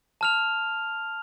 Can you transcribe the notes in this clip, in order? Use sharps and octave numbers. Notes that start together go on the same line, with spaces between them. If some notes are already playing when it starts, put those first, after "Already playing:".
A5 F6 F7